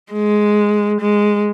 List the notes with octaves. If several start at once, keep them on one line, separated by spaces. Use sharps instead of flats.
G#3
G#3